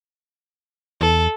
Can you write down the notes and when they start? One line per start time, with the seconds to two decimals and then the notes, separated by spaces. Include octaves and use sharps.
1.01 E2 A4